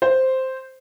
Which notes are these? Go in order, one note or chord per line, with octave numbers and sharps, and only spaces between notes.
C5